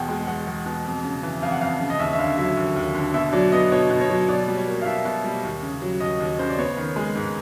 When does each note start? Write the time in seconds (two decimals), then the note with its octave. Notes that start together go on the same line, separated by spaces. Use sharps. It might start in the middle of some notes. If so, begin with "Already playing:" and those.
Already playing: E2 B2 F#5 G5
0.08 G#3
0.27 E2 F#5
0.47 E2
0.66 B2
0.85 F2
1.04 C#3
1.23 E3
1.42 F2 F5
1.52 F#5
1.61 F2 F5
1.80 C#3
1.90 D#5
1.99 D#2 E5
2.13 E5
2.19 D3 F5
2.38 F#3 E5
2.57 D#2
2.76 D#2
2.94 D3
3.14 B2 E5
3.33 F#3 D5
3.52 B3 D#5
3.72 B2 C#5
3.90 B2
4.01 C#5
4.10 F#3
4.28 B2 D5
4.48 G3
4.57 C#5
4.67 A#3
4.82 F5
4.86 B2 E5
5.05 B2
5.24 G3
5.43 D#2
5.62 C#3
5.82 F#3
6.00 D#2 D#5
6.20 D#2
6.39 C#3 C5
6.50 D5
6.58 B3 C#5
6.77 D#3
6.96 G#3
7.15 G#2